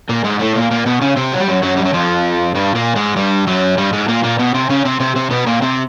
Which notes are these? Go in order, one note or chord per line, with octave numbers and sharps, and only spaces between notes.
A#2 A#3
G#2 G#3
A2 A3
A#2 A#3
A#2 A#3
B2 B3
C#3 C#4
C3 C4
F#3
G3
F#2 F#3
F#2 F#3
G3
F#3
F2 F3
G2 G3
A#2 A#3
G#2 G#3
G2 G3
F#2 F#3
G2 G3
G#2 G#3
A#2 A#3
A#2 A#3
B2 B3
C3 C4
C#3 C#4
C3 C4
C3 C4
C3 C4
B2 B3
A#2 A#3
C3 C4